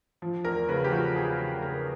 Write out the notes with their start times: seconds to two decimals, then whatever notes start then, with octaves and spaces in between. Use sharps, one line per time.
0.22 F3
0.45 E2 A#4
0.69 C#3 B4
0.84 G4
0.92 F3 F#4
1.15 E2 G#4
1.39 C#3
1.62 C#3 A#4